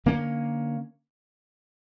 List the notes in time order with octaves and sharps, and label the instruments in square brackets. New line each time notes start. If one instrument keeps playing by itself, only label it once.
[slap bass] D3 A#3 C#4